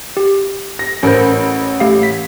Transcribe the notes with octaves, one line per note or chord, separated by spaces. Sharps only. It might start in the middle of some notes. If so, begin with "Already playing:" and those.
G4
A#6
A1 C#4 A#4 C5
A3 G4 F5
B6